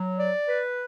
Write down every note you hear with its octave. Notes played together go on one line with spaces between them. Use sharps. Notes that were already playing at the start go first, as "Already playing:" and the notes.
Already playing: F#3
D5
B4